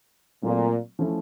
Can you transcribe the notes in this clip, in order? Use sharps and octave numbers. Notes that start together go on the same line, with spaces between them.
A#2 F#3 A3 C4 F4
F3 A3 C#4 E4